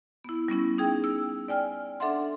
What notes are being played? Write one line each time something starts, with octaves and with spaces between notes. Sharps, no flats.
B3 E4
G3 B3 C#4 E4
D#4 G#4 G5
E6
D5 G5 G#5 F6
D4 A4 E5 F#5 C6